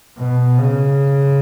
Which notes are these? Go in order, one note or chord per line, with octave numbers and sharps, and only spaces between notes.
B2
C#3